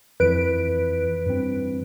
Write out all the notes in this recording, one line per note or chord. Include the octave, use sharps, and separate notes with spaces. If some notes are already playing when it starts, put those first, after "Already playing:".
F2 E3 B4 D7
G2 E3 C4